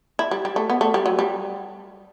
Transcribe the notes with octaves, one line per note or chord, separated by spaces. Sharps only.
E4
G3
G3
A3
B3
A3
G3
F#3
G3